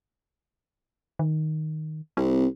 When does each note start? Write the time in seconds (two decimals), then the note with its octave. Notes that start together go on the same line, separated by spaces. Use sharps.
1.19 D#3
2.17 C2 C4